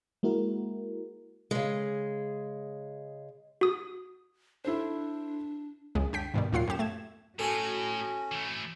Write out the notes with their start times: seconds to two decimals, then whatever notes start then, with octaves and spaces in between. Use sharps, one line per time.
0.23 G#3 A#3 E4 F#4 A#4
1.51 C#3 G#3
3.61 F#4 D#6
4.65 D4 E4 A4 C5
5.95 C#2 F#2 G#3
6.13 D3 G5 B6
6.34 G#2 B2 D#3 G3
6.52 D#2 A#2 F#3 F4 F#5 C7
6.67 F#2 F#3 G4 E7
6.79 A3 G#6 E7
7.39 A2 C#4 F#4 A4 G#5
8.32 E3 A3